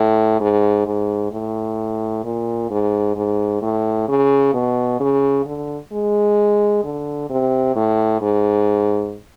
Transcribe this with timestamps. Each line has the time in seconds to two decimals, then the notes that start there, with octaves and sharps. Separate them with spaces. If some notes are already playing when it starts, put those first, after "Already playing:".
Already playing: A2
0.40 G#2
0.86 G#2
1.32 A2
2.24 A#2
2.70 G#2
3.16 G#2
3.62 A2
4.08 C#3
4.54 B2
5.00 C#3
5.46 D3
5.92 G#3
6.84 D3
7.30 C3
7.75 A2
8.21 G#2